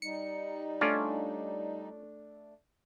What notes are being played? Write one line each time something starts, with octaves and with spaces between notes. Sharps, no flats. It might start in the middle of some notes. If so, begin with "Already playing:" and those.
G3 D#4 C#7
A3 C#4 D4 F4 D5